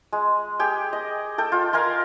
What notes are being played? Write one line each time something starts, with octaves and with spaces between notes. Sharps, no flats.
G#3
G4 G#4 G5
D#5
A4 G5
F4
A#4 F5 G#5 C6